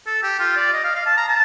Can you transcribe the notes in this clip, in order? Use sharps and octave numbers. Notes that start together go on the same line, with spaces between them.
A4
G4
F4
D5
D#5
F5
F5
A5
A#5
A5